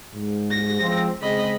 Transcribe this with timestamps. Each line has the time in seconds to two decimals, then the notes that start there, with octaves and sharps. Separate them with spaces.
0.14 G#2
0.51 A#6
0.81 F3 G#3 C4
1.22 C#3 G#3 C4 D#5 B5